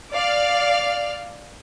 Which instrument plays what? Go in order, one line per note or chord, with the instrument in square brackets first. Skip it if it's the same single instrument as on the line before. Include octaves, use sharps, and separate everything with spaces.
[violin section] D5 F5 F6